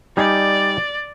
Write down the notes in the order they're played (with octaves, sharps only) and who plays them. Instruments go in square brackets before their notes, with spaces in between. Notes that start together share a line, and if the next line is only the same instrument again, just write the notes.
[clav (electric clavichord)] G3 D#4 G#5 [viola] D5